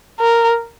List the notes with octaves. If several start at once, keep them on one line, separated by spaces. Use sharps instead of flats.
A#4